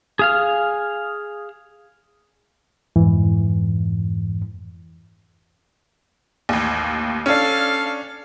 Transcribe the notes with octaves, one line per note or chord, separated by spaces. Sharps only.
G#4 F5 F6
F2 G#2 E3
A1 D#2
C#4 D4 A4 F5